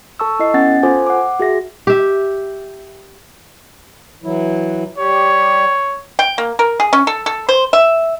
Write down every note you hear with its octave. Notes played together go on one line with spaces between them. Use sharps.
A4 A5 C#6 E6
E4 A4 D#5 C7
B3 C#4 F#5 G#5 A6
F4 A4 C5 G#5 D6
F#5 D6
F#4 G#4 E5 A#6
G4 E5
E3 F#3 E4
G3 G4 C#5
G5
A#3
A#4
G#4
C#4
A4
A4
C5
E5